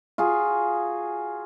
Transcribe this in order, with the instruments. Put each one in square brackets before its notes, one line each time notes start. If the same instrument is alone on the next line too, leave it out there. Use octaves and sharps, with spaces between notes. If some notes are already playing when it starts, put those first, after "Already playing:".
[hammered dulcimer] F4 F#4 G#4